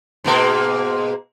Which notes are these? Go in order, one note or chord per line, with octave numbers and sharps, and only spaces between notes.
G#2 B2 A#3